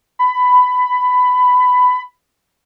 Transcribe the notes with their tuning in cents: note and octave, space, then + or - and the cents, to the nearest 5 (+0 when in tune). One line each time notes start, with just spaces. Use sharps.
B5 +15